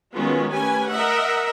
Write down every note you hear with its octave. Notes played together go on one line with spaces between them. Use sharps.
D#3 F#3 G#3 B3 C#4 F4
A3 C#4 G4 B4 G#5
A#4 D#5 E5 F#5